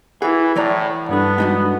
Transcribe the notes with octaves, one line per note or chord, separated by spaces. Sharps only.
E3 E4 G#4 F#5
A2 E3 D5 A#5
G2 G3 B3 D4 A4
G#3 D#4 F#4